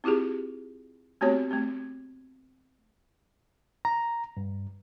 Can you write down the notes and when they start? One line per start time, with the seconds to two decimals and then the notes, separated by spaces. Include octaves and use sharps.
0.04 C4 E4 F4 G4 G#4
1.21 A3 B3 C4 F#4 G4 C#5
1.51 A3 C4
3.85 A#5
4.37 G2